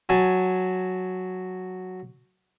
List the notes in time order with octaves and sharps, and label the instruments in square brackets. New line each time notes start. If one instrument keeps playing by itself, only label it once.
[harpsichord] F#3 G#5 A5